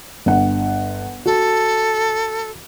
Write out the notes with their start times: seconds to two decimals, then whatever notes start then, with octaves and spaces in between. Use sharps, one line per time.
0.26 G1 F#5
1.26 F#4 A4